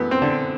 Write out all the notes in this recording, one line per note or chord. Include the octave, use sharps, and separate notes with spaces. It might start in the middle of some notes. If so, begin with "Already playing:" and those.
Already playing: F#2 E3 A3 B3
C4
D3 D4